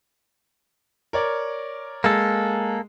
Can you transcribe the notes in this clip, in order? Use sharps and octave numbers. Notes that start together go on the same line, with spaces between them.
A#4 C#5 D5
G#3 A#3 A4